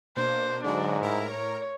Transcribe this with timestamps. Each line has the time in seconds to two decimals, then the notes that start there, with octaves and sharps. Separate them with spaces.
0.17 B2 A#3 D4 C5
0.64 G#2 D3 F#3 D4 F#4
1.01 A2 E4 A#4 A#5
1.31 C#5